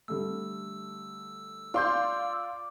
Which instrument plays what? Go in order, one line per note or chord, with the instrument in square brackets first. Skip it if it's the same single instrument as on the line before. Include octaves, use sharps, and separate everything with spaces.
[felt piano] D3 G3 A3 [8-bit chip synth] E6
[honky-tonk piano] F4 C6 G6 [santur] D5